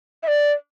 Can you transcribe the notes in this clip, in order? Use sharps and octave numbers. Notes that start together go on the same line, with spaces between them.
E5
D5